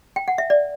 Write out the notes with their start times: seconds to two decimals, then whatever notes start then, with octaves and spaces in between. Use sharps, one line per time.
0.16 G5
0.28 F#5
0.38 E5
0.50 D5